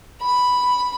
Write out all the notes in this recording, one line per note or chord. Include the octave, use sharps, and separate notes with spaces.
B5